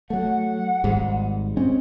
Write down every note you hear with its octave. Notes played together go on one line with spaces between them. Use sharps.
F#3 A3 F#5
G#1 G#2 G3
G#3 C4 C#4